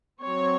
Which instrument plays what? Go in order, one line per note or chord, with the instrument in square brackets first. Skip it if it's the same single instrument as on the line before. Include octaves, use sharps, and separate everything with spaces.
[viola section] F#3 C4 C#5